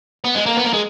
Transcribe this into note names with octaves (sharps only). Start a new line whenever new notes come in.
B3
G#3
A#3
B3
A#3
G#3